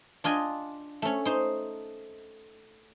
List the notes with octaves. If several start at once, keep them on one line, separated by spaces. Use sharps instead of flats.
D4 F4 D#5 G#5
A3 C#4
D#4 C5